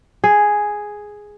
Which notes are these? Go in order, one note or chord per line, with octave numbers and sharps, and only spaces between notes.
G#4